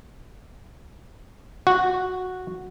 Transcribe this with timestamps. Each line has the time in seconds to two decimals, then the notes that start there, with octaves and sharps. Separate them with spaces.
1.67 F#4